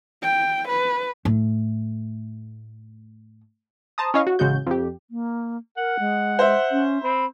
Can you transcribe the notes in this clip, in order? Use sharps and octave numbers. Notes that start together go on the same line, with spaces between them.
G5
B4
A2 A3
C5 A5 A#5 D#6
C#4 E4 C#5 D#5 F5
F#4
A1 C#3 G#3 F#4 G6
F2 G4
A#3
A#4 F#5
G#3
C5 E5
C#4
C4 B5